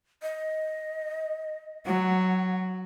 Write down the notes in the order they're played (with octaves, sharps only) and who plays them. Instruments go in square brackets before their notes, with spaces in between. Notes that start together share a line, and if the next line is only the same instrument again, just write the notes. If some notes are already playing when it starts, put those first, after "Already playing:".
[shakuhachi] D#5
[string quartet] F#3 [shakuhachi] F#5